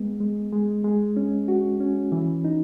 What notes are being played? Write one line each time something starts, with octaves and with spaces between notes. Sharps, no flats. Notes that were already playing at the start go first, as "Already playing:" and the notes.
Already playing: G#3 B3
G#3
G#3
G#3
C#4
F#4
C#4
E3
D#4